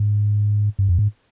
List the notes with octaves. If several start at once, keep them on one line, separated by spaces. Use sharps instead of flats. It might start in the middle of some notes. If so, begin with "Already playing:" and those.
Already playing: G#2
G2
F2
G#2